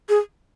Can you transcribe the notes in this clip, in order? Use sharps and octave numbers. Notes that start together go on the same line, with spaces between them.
G#4